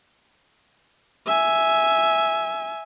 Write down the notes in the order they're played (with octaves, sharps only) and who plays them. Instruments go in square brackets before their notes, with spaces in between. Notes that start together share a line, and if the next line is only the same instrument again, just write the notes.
[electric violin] E5 G#5